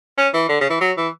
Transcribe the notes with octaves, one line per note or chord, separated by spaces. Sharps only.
C#4
E3
D3
C#3
E3
F#3
E3